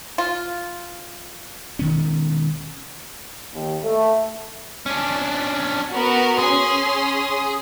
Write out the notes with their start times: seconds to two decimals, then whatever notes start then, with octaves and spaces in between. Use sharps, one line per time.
0.18 F4
1.79 E1 D#3 C#4
3.54 D#2
3.83 A3
4.86 C#4 D4
5.94 B3 F#4 A#4
6.39 C#4 G#4 C6